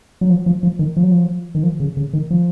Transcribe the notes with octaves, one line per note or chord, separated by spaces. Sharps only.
F#3
F3
F3
F3
D#3
F3
F#3
F3
D#3
F3
C#3
C#3
D#3
F3